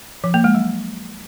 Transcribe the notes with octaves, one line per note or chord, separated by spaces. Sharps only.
F3
A#3
G#3
F#3